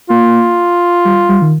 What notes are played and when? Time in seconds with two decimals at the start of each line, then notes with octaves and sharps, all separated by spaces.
0.10 A#3 F4
1.05 G3
1.29 G3
1.42 D#3